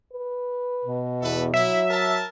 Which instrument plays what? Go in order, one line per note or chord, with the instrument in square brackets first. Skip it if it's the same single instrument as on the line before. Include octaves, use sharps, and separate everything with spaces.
[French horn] B4
[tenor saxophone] B2
[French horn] E2 [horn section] E4 A4 B4
[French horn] F#3 [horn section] E4 [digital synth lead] E5
[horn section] A#4 A5